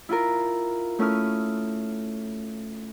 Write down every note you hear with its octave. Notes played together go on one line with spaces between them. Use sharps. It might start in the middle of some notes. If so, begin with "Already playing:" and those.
E4 F4 A#4
A3 C#4 E4 D#6 F6